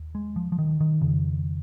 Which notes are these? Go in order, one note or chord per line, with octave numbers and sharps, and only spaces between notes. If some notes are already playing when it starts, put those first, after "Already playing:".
Already playing: D#2
G#3
F3
F3
D#3
D#3
F2 C#3